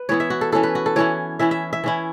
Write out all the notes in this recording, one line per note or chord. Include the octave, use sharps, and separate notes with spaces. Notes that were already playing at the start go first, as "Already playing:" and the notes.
Already playing: B4
E3 B3 E4 C#5
E5
F#4
A4
E3 C#4 E4 A4
B4
F#4
A4
E3 C#4 E4 C#5
E3 C#4 E4 E5
E5
E5
E3 C#4 E4